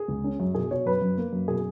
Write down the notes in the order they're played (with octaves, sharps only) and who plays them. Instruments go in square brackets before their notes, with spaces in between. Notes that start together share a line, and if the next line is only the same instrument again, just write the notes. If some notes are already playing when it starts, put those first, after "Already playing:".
Already playing: [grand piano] G#4
C#2
C#4
F#2
B2 G#4
B2 C#5
F#2 B4
F#2
A#3
F#2
B2 G#4